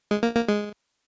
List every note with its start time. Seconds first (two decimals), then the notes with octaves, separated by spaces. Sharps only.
0.11 G#3
0.23 A#3
0.36 A#3
0.48 G#3